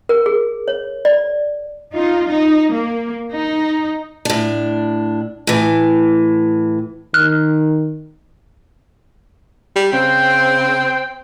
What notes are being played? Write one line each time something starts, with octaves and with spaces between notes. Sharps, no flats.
A#4
G#4
C#5
D5
D#4 F4
D#4
A#3
D#4
A2 D4
A2 E3
D#3 F6 F#6
G3
C#3 C4 G5